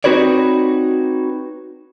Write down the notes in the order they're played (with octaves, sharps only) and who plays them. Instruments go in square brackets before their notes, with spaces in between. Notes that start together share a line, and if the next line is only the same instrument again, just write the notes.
[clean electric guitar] C4 D#4 F#4 B4 C#5 D5